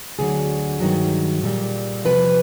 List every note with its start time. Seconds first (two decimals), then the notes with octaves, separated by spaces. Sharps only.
0.19 D2 D3 F#3 G#4
0.80 G2 D#3 F#3
1.43 A#2 G3
2.05 E2 C3 F3 B4